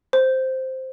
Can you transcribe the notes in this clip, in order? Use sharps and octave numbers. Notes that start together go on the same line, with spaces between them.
C5